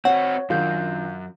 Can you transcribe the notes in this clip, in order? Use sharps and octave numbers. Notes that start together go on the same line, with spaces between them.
C4 F#4 C#5 F#5
F#2 D#3 D4 F4 F5 G6